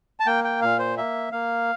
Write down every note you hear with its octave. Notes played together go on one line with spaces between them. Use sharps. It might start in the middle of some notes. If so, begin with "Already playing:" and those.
A5
A#3 G5
G5
A#2 F5
C5
A#3 E5
A#3 F5